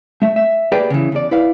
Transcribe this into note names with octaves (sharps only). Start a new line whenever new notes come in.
A3 E5
E5
A#3 G4 G#4 B4 D5 G5
C#3 E3
E2 D5
E4 B4 D5 F5